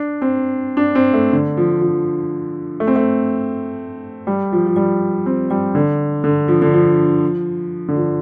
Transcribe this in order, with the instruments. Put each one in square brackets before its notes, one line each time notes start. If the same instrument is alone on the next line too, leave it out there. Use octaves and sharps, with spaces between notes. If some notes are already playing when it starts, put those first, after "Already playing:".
Already playing: [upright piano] D4
C4
D4
C4
A3
D3
F3
F3
A3
C4
A3
G3
F3
F3
G3
C4
G3
D3
D3
F3
D3
F3
D3
F3